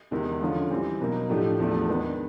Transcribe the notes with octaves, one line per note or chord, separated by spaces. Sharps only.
E2 C3 D#3 G#3
D3 F3 G#3 C#4 F4
E3 G3 C4
B2 F#3 A#3 D#4
A2 F3 A3 D4 G4
E2 C3 F3 A3 D4
D#3 G#3 B3 D4